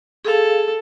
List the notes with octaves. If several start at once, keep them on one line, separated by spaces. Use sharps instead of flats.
G#4 A4 F5